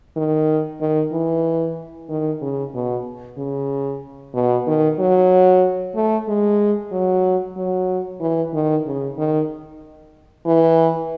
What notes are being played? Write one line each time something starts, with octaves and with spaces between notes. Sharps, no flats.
D#3
D#3
E3
D#3
C#3
B2
C#3
B2
D#3
F#3
A3
G#3
F#3
F#3
E3
D#3
C#3
D#3
E3